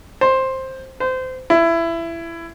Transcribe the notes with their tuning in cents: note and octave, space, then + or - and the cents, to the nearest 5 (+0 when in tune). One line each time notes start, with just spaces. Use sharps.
C5 +10
C5 -25
E4 +20